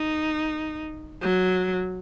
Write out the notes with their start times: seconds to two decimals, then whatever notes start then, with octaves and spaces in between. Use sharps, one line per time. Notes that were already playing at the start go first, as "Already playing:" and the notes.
Already playing: D#4
1.22 F#3